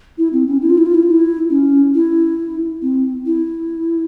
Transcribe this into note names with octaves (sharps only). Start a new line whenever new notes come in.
E4
C4
C#4
E4
F4
E4
F4
E4
F4
E4
C#4
E4
C4
E4